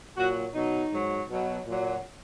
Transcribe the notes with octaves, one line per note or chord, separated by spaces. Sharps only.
A#2 F#3 F#4
B2 F#3 D#4
G#2 F#3
B2 F#3
A#2 F#3